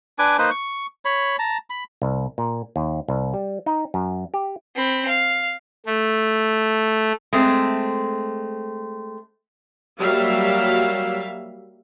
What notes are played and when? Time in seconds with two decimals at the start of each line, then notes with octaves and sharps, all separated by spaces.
0.19 D4 B4 G#5 D6
0.38 A#3 D#4 B4 C5
0.51 C#6
1.05 C#5 B5
1.39 A5 A#5
1.70 B5
2.02 C2
2.38 A#2
2.76 D#2
3.08 C2
3.34 G3
3.66 D#4
3.94 F#2
4.34 G4
4.76 C4 B5
5.08 F5
5.86 A3
7.33 G#3 A3 C4
9.99 F#3 G3 A#3 E5 F5